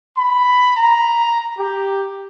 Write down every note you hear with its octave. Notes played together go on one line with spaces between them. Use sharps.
B5
A#5
G4